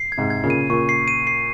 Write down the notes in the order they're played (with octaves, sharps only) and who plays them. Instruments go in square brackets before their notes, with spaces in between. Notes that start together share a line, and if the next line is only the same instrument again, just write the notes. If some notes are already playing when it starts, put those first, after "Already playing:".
Already playing: [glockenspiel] C7
G#6
[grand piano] G#2 C3
[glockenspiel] G#6
[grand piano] A#2 C#3
[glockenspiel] D#7
[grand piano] A#2 C#3 [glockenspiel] C#6
[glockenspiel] C7
D#7
C7